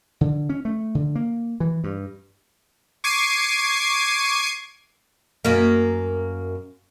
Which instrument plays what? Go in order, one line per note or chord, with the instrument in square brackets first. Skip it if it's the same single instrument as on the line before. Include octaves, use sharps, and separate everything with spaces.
[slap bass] D3
C#4
A3
D3
A#3
E3
G2
[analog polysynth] C#6 D6 G#6 C7 D#7
[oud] F#2 A#3